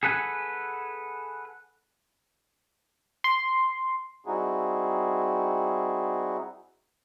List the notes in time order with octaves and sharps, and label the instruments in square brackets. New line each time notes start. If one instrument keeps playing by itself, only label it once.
[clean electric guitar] G#4 A4 B4 F#5 G#5
[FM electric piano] C6
[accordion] G3 C4 D#4 E4 F#4 G#4